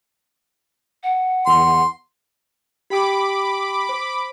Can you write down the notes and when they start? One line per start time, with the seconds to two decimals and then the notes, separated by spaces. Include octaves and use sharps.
1.03 F#5
1.46 E2 C6
2.90 G4 G5 B5 D6 D#6
3.89 C5